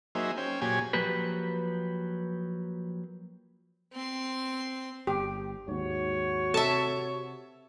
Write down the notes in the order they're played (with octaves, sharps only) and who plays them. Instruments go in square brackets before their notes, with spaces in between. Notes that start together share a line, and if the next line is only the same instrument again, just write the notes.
[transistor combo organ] F#3 A#3 D#4 G#4 C5 E5
C#4 C5 G5
A#2 F#3 G4 G#4 C#5 G#5
[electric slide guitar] F3 F#3 A#3 G4 B4
[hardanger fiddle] C4 C6
[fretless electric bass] G1 [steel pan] G4
[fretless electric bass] D#2 G#2 [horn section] F#4 C#5
[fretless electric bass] C3 [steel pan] A4 [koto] E5 A5